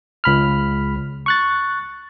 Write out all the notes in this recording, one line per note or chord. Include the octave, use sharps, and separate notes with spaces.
C#2 B5 F6
C#6 F#6 A6